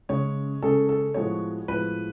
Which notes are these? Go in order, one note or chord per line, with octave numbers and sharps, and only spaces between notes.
C#3 G#3 C#4 G#4 C#5
C#3 G#3 C#4 G#4 A4
A4
A2 F3 G#3 B3 F#4 C#5
A2 F3 G#3 B3 F#4 B4